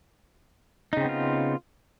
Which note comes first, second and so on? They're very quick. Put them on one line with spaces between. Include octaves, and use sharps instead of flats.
D#4 C#3 C4 B3 F4